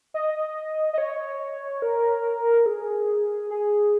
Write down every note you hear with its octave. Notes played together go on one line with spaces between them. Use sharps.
D#5
D#5
C#5
A#4
G#4
G#4